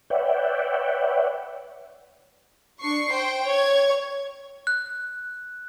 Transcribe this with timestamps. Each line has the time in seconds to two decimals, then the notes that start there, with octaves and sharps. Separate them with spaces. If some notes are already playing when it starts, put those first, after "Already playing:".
0.10 B4 C#5 D5 E5 F#5 G5
2.79 D4 C#6 C7
3.13 C5 G5
3.46 C#5 G#6
4.67 F#6